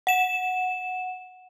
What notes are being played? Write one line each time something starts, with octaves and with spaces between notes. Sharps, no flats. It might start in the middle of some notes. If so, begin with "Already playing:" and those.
F#5 E7